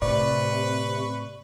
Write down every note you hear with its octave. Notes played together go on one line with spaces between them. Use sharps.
A2 C3 B4 D5 C#6